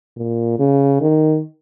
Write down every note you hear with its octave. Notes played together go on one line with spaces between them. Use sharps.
A#2
C#3
D#3